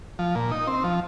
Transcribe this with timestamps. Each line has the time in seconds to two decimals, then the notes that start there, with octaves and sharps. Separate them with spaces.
0.19 F3
0.35 A#2
0.52 D#4
0.67 C4
0.84 F3